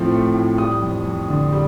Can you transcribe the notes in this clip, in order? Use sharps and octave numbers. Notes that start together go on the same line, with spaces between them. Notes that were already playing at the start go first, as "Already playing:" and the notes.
Already playing: A2 F3 A3 C4
A3
A2
G3 D#6
F2
F2
D3
G3